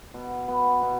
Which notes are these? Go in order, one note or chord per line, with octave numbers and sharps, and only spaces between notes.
B2
B3
B2